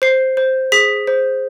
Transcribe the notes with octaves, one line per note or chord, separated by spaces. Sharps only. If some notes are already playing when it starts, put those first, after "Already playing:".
C5 C7
C5
G#4 B6
C5